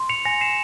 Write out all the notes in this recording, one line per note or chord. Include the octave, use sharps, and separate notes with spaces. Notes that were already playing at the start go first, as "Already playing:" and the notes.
Already playing: C6
C#7 F7
G#5 A#6 C#7
C7 E7